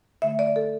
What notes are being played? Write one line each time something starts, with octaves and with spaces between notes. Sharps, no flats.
D3 A3 E5
D5
A4